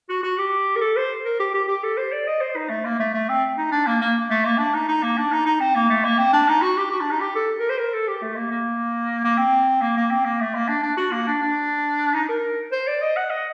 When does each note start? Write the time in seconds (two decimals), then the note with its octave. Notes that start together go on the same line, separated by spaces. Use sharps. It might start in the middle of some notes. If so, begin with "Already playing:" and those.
0.09 F#4
0.23 F#4
0.38 G4
0.76 A#4
0.81 A4
0.97 C5
1.25 A#4
1.40 G4
1.54 G4
1.68 G4
1.84 A4
1.98 C5
2.12 D5
2.27 D#5
2.41 C5
2.56 D#4
2.70 A3
2.85 A#3
3.00 A3
3.14 A3
3.29 C4
3.58 D#4
3.72 D4
3.87 A#3
4.01 A#3
4.30 A3
4.45 A#3
4.58 D4
4.74 D#4
4.89 D#4
5.03 A#3
5.18 D4
5.32 D#4
5.46 D#4
5.60 C4
5.75 A#3
5.89 A3
6.04 A#3
6.19 C4
6.33 D4
6.48 D#4
6.62 F#4
6.77 G4
6.92 F#4
7.01 D4
7.11 D#4
7.20 G4
7.36 A4
7.59 A#4
7.69 C5
7.78 A#4
7.94 A4
8.08 G4
8.22 A3
8.36 A#3
8.51 A#3
9.24 A#3
9.38 C4
9.82 A#3
9.97 A#3
10.11 C4
10.25 A#3
10.41 A3
10.55 A#3
10.69 D4
10.83 D4
10.98 F#4
11.12 A#3
11.27 D4
11.42 D4
12.14 D#4
12.29 A#4
12.72 C5
12.88 D5
13.02 D#5
13.17 F#5
13.31 D#5